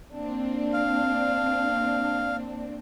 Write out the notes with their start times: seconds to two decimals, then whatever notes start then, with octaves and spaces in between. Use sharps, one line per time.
0.13 A#3 C4 D4
0.73 F5